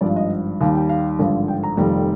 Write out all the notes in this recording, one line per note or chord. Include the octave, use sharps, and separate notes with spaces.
G#1 G2 F3 D5
D#5
D#2 D#3 G3 F5
G5
F5
G#1 G2 D3 F3
G5
A#5
F1 F2 D#3 G3